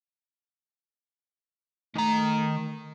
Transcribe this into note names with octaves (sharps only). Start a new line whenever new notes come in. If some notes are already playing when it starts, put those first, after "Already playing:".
D#3 A3 A#5